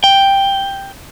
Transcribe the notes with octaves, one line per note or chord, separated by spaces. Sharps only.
G5